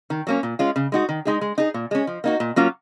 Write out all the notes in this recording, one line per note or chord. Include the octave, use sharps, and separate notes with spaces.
D#3
F#3 A#3 C#4
A#2
G#3 C#4 F4
C#3
G#3 D#4 F#4
D#3
G#3 D#4 G#4
G#3
D#4 G#4
A#2
G#3 C#4
F3
A#3 D#4 F#4
A#2
F#3 A#3 C#4 F4